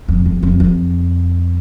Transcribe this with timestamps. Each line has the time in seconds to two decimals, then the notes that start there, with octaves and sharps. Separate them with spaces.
0.08 F2
0.26 F2
0.43 F2
0.60 F2